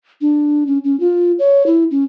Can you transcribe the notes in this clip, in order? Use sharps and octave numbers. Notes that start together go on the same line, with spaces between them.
D4
C#4
C#4
F4
C#5
E4
C#4